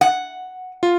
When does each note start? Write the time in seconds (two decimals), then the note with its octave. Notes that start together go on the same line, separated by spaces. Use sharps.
0.01 F#5
0.83 F4